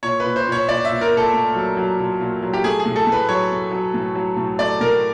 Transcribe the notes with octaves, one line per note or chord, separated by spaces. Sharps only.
A#2 C#5
A#2 B4
C5
A#2
C#5
A#2 D5
E5
A#2
A#4
A#2
A4
A3
F#3
F#3
A#2
A#2
F#3
G4
A3 G#4
G#4
A2
A4
A2 B4
F#3 C#5
A3
F#3
A2
F#3
A2
A3 D5
A2 A#4